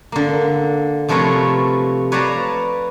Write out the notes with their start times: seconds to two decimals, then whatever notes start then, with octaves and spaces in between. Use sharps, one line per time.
0.12 D3 A#3
1.09 C3 F3 A3 A#4 B4 C#5
2.12 B4 C#5 D5 F5 A5 A#5